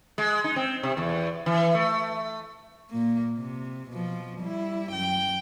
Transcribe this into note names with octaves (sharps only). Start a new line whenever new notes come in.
G#3
D#4
C4
C3
E2
E3
A3
A#2 A#3
C3
B2 F3
G3 E4
F#2 G5